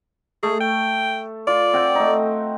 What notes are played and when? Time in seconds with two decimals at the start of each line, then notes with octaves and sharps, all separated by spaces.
0.43 A3 G#4
0.60 G5
1.47 F4 D5
1.73 C4 F#5 G5
1.95 A3 D#4